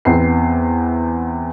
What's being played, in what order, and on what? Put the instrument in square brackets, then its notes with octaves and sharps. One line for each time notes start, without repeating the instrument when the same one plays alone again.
[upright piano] E2 B3 C4 C7